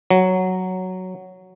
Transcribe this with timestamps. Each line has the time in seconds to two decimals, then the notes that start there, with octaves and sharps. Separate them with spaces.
0.10 F#3